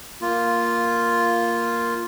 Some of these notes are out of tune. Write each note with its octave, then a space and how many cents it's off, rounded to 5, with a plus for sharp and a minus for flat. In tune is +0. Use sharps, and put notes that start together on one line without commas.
A#3 +0 F4 +0